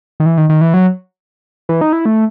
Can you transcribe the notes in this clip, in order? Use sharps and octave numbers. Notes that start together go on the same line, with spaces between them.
D#3
E3
D#3
D#3
E3
F#3
E3
D#4
E4
A3